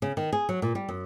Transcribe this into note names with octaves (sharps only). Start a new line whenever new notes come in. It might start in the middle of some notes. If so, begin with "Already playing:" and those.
C#3
D#3
G#4
F#3
A#2
G3
F#2